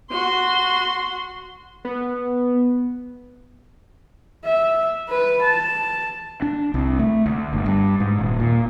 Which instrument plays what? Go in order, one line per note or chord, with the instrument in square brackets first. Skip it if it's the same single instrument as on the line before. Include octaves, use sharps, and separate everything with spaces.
[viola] F#4 C6
[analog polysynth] B3
[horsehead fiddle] E5
B4
A5
[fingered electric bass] D4
C2
A3
D2
G1
G2
G#2
D#1
A#2